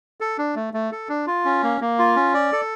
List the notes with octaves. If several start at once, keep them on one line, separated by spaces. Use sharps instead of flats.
A4
D4
A3
A3
A4
D4
F4
C#4
A#3
A#3
F4
C#4
D5
A4